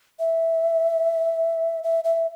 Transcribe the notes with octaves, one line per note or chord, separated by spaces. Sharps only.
E5
E5
E5